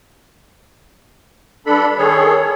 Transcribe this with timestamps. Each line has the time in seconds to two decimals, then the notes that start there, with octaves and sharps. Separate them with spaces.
1.66 G2 D4 A4 B5
1.98 D#3 G#4 A4 C#5